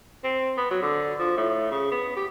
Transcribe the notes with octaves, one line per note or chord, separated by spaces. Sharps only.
C4
B3
F#3
D3
F3
A2
C#3
B3
G4